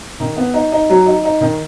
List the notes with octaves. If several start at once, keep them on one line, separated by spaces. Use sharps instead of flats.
D#3
B3
D#4
D#4
F#3
D#4
D#4
D#3